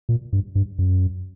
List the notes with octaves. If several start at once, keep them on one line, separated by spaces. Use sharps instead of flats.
A#2
G2
G2
F#2